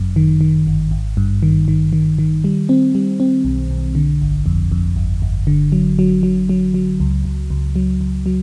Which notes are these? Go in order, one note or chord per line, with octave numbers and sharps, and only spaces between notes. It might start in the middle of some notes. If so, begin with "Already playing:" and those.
Already playing: G1 F#2
D#3
D#3
G1
G#1
G2
D#3
D#3
D#3
D#3
G3
C4
G3
C4
B1
B1
D3
G1
F2
F2
G1
G1
D3
F#3
F#3
F#3
F#3
F#3
C#2
C#2
C#2
F#3
C#2
F#3